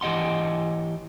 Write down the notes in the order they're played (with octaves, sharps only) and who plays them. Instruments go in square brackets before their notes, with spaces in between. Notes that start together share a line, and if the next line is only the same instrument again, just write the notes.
[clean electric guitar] E3 G4 D#5 F#5 C6